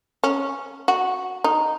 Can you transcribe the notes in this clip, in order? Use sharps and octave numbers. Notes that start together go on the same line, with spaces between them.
C#4
F#4
D#4